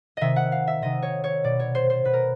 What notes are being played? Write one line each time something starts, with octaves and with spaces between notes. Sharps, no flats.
C3 D#3 D#5 E5
F#5
F5
E5
C3 D#3 D#5
C#5
C#5
B2 D5
C#5
C5
C5
B2 B4
A#4